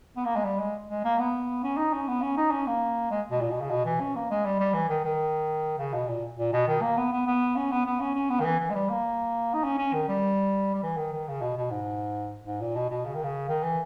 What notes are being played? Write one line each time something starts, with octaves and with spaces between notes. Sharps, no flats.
B3
A#3
G#3
G3
G#3
G#3
A#3
B3
C#4
D#4
C#4
B3
C#4
D#4
C#4
A#3
G#3
B2
A#2
B2
C#3
B2
E3
C#4
A#3
G#3
G3
G3
E3
D#3
D#3
C#3
B2
A#2
A#2
B2
D#3
A#3
B3
B3
B3
C#4
B3
B3
C#4
C#4
B3
D#3
E3
E3
G#3
G3
A#3
D#4
C#4
C#4
D#3
G3
G3
E3
D#3
D#3
C#3
B2
B2
G#2
G#2
A#2
B2
B2
C#3
D#3
C#3
D#3
E3